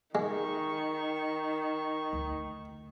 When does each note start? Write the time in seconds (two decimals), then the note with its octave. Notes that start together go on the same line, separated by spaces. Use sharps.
0.15 D#3 G#3 C#6
2.13 D2